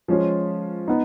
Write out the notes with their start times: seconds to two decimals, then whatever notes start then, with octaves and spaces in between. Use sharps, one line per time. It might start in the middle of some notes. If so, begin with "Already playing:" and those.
0.08 F3 G#3 C#4 F4
0.88 B3 D#4